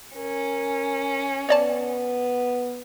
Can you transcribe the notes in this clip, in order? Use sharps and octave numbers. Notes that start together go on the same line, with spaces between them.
C#4 A#4
B3 C#5 D5 A5